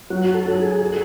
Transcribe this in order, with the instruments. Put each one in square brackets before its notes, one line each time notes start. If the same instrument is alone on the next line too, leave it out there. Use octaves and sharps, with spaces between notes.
[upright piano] F#3 [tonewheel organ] F#4
[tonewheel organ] A4
[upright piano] F#3
[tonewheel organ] G#4
[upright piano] A4